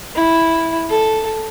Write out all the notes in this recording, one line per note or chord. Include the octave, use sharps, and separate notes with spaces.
E4
A4